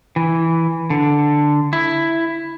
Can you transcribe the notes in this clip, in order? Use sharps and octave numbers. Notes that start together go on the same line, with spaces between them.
E3
D3
E4